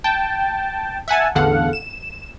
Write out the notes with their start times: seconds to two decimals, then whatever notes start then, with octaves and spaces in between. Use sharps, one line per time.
0.04 G5 A5
1.08 E5 F#5 G#5 A5
1.35 A1 E2 D3 A4 F5 F#5
1.73 E7